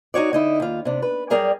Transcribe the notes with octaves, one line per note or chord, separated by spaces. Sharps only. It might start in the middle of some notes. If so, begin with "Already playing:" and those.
D#4 F#4 C#5 D5
D3 D#4 E4
D#2 F4
C3 D4
B4
F#2 G3 G#4 A#4 D5 G5